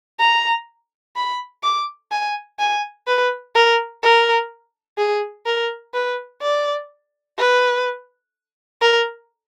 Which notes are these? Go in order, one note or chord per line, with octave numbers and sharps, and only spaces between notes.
A#5
B5
D6
G#5
G#5
B4
A#4
A#4
G#4
A#4
B4
D5
B4
A#4